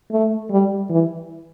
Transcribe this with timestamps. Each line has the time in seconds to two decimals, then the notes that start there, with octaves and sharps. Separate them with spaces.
0.12 A3
0.50 G3
0.90 E3